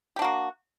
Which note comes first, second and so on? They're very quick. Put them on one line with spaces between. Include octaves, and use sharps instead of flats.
G4 D4 F#4 A#3